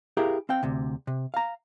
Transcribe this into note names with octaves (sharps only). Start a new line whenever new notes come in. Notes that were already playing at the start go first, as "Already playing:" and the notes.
E4 G4 G#4 A#4 E5 F5
C4 F5 G5
D2 C3
C3
F5 A#5